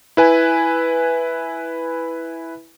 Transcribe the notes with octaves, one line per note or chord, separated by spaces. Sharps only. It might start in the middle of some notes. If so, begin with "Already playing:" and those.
E4 B4 G#5